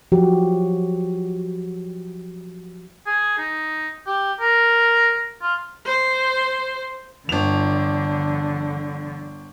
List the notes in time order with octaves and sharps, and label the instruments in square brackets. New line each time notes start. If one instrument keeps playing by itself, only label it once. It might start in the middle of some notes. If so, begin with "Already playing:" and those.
[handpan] F3 F#3 F#4 G4
[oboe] G#4
D#4
G4
A#4
F4
[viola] C5
[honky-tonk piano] G1 F7 [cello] D3